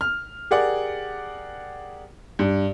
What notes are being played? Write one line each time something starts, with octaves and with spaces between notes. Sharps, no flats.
F6
G4 G#4 A#4 D5 F#5
G2